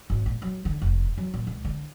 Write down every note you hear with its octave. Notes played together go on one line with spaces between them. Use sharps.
G#1
A#2
F#3
D3
F1
F#3
A#2
C#2
D3